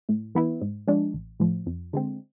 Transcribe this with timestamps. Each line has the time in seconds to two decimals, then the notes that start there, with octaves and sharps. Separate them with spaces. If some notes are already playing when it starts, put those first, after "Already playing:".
0.09 A2
0.35 E3 B3 E4
0.61 G#2
0.88 F3 G#3 D4
1.14 A1
1.40 A2 F3
1.66 F2
1.93 D3 G#3 C4